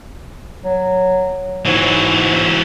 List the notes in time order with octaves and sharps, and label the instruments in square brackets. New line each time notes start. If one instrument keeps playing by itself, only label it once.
[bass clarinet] F#3
[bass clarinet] G#2 [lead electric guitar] E3 F#3